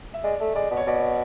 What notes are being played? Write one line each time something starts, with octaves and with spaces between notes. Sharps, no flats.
E5
G#3 D5
A3
G#3 D5
B2
C#5
B2 D5